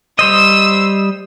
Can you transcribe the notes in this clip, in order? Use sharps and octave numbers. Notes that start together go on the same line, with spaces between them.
G3 C5 D#5 E6